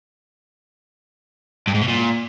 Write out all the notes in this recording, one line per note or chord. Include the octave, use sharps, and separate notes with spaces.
G2
G#2
B2
A#2